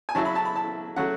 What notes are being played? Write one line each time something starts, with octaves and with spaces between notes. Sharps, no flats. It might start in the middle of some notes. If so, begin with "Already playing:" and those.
G#5
C#3 F#3 C#4 E4 A5
B5
A5
B5
A5
C#3 F#3 A3 F#5